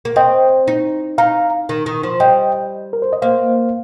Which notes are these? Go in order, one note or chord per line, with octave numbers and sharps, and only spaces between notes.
A#3
C4 D#5 G5
D#4
D#4 F5 A#5
D#3
D#3
F3
G3 D#5 G5
A#4
C5
D#5
A#3 C5 F5